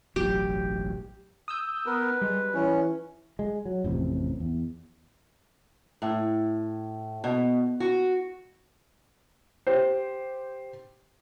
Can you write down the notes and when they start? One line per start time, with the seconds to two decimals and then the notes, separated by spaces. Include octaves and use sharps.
0.16 E1 A1 F#3 G4
1.48 D#6 E6 G6
1.86 B3 A#4 B4
2.22 G3 G#3
2.54 E3 C#4
3.39 G#3
3.65 F#3
3.84 A1 F2 C3
4.40 E2
6.02 A2
7.24 B2
7.80 F#4
9.67 G4 C5